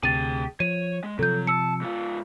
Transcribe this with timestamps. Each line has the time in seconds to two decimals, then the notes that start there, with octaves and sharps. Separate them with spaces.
0.03 D2 C3 G#4 G5 A6 D#7
0.60 F3 C#5 D#7
1.04 G#3
1.19 C3 F3 F#3 A4 G6
1.47 A5 E6 C#7
1.81 G#2 F4